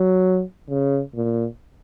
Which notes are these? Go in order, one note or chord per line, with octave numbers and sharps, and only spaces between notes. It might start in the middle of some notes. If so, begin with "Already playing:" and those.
Already playing: F#3
C#3
A#2